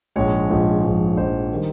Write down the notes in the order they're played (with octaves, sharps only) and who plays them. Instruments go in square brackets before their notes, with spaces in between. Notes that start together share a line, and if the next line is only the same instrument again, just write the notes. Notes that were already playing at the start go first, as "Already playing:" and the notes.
[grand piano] A#1 G#2 F3 G#3 C#5
A#1 G#2 F3 G#3
A#1 G#2 F3 G#3
A#1 G#2 F3 G#3 C5
D#3 G3